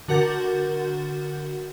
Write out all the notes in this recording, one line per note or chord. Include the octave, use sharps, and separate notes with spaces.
D3 F#4 A#4 F#5 G6 A6